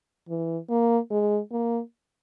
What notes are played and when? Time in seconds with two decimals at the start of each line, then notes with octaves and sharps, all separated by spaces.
0.29 E3
0.69 A#3
1.11 G#3
1.52 A#3